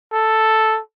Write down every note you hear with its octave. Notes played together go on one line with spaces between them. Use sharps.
A4